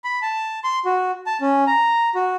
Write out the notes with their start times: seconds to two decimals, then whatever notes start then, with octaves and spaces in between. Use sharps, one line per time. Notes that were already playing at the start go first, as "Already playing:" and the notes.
0.04 B5
0.22 A5
0.64 C6
0.85 F#4
1.26 A5
1.41 C#4
1.67 A#5
2.15 F#4